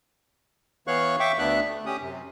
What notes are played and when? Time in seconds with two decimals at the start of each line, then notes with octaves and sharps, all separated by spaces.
0.87 E3 B3 C#5 F5 C#6 F#6
1.20 E5 G5 C#6 D6
1.39 D2 B3 D4 E5 F#6
1.68 A3
1.86 C#4 G4 D#6
2.01 F#2 C3